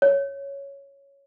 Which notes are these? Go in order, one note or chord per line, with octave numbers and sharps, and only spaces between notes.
C#5